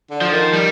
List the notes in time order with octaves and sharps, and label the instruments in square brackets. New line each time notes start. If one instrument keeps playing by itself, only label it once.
[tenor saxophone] D3
[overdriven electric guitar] F3
[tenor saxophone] D#3
[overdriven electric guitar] G3